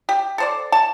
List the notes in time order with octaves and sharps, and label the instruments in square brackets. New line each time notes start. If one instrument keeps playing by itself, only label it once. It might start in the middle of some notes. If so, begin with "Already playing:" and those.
[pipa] G4
A4 C5 D5
A5